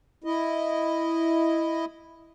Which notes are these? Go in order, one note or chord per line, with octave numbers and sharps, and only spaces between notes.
E4 D#5